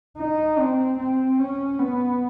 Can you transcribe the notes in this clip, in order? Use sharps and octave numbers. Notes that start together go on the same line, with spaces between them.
D#4
C4
C4
C#4
B3